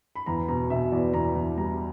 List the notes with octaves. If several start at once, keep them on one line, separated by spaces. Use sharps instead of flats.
B5
E2 A#5
B2 A#5
B2 E5
E2 D5
E2 A#5
E2
G3 A#5